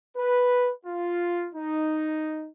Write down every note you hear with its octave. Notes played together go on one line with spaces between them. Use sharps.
B4
F4
D#4